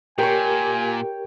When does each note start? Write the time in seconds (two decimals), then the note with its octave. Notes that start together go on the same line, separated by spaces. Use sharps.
0.18 A#2 G4 A#4 C#5 G5 G#5